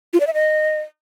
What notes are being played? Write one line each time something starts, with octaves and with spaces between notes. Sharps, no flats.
F4
D5
E5
D#5